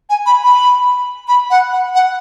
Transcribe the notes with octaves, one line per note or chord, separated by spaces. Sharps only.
G#5
B5
B5
B5
F#5
F#5
F#5